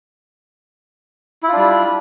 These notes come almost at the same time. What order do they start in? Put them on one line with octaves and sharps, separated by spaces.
E4 F4 D4 G3